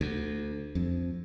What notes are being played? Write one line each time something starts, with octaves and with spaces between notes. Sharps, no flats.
D2
F2